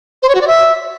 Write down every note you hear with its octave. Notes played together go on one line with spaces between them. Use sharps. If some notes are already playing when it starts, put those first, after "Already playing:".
C5
C#5
F#4
D5
E5